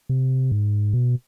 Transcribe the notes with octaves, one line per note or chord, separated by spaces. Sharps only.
C3
G#2
B2